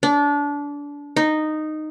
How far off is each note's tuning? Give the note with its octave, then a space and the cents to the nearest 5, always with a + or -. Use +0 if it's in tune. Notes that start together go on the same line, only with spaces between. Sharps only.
D4 -25
D#4 -10